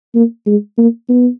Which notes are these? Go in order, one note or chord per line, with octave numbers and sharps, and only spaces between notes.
A#3
G#3
A#3
B3